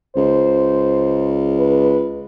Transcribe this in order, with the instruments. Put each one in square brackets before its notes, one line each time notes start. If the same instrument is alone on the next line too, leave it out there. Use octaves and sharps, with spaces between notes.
[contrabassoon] C#2 [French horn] C5
[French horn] B4